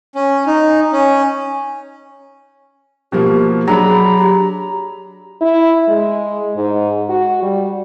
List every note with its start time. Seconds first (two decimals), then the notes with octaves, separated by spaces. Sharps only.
0.15 C#4
0.47 D#4
0.92 C#4
3.12 B2 F3 A#3 G4
3.67 F#3 D4 G#4 A#5 B5
4.18 G4
5.41 E4
5.88 G#3
6.56 G#2
7.09 F#4
7.42 G3